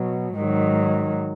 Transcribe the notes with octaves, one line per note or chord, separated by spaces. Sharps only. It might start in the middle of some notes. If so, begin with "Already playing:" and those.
Already playing: B2 F#3
G#2 D#3 F#3